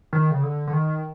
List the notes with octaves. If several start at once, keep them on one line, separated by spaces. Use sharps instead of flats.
D#3
C#3
D3
D3
D#3